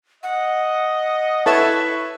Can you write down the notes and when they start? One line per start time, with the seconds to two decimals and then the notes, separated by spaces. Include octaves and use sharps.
0.23 D#5 F#5
1.46 E4 A4 B4 C#5 E5 A5 C#6